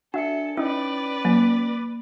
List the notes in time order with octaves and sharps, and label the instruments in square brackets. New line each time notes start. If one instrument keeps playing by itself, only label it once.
[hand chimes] D4 C#7 [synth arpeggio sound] F#4 E5 [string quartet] A4
[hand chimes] C#4 [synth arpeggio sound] D#4 E4 [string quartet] B4 D5
[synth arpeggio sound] F#3 [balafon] A#3